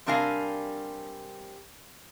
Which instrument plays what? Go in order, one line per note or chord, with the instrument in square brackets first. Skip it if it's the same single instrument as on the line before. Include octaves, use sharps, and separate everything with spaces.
[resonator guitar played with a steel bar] C3 G3 D4 A#4 F5 G#5